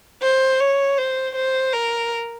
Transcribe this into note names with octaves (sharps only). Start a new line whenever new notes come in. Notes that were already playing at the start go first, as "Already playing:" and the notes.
C5
C#5
C5
C5
A#4